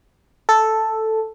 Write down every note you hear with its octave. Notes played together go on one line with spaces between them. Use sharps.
A4